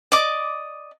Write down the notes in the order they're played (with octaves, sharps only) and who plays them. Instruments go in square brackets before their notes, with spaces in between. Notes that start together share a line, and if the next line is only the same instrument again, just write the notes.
[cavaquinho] D5 D#5 D6